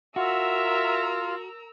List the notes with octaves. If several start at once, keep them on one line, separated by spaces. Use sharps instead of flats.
F4 F#4 A#4 E5 A#5 E6